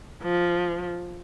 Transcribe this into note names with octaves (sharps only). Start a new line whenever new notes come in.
F3